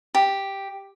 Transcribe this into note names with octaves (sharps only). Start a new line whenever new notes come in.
G4